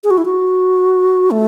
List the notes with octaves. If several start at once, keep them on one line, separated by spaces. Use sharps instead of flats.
G#4
F#4
E4
F#4
A3